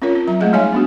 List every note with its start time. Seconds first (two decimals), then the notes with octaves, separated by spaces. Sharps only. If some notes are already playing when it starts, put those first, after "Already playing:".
0.02 C4 C#4 F4 A#4 C#5
0.16 C4
0.27 F#3 A#5
0.40 G#3 A3 G#4 D#5
0.53 G3 D#4 C#5 E5 G#5
0.72 B3 D4 F#4